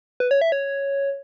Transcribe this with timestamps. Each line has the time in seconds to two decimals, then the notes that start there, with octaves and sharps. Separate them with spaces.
0.20 B4
0.31 C#5
0.41 E5
0.52 C#5